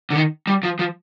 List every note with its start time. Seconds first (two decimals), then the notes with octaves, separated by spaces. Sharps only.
0.10 D3
0.15 D#3
0.47 G3
0.63 F3
0.79 F3